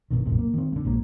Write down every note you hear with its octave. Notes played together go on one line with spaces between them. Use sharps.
G1 B2 D#3
B1 F#2 A2 C3
A#3
D#3 C4
D3 A#3
A#1 G#2 A#3